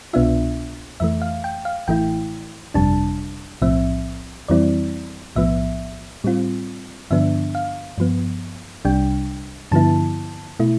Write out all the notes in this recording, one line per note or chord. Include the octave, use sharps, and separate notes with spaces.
C2 B2 B3 D4 F4 E5
F2 E3 A3 E5
F5
G5
F5
A1 A2 E3 A3 E4 G5
G1 F2 C3 G3 D4 A5
B1 A2 F3 C4 E5
F2 E3 G3 C4 E4 D5
B1 A2 F3 B3 E5
A2 G3 C4 F4
G2 D3 F3 B3 D4 E5
F5
G2 F3 B3
C2 C3 G3 D4 G5
G2 D3 F3 B3 E4 A5
B2 A3 E4